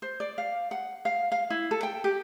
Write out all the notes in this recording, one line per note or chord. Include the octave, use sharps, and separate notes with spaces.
C5
D5
F5
F#5
F5
F5
E4
A4
G5
G4